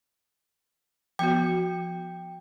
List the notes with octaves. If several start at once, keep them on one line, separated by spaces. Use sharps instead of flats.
F3 B3 F#4 G5